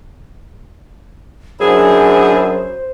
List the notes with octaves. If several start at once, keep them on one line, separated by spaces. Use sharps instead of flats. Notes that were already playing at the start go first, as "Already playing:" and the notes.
F#2 D4 E4 G#4 C5